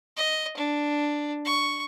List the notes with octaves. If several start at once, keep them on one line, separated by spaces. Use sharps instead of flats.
D#5
D4
C#6